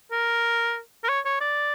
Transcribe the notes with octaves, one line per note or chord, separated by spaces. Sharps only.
A#4
A#4
C#5
C#5
D5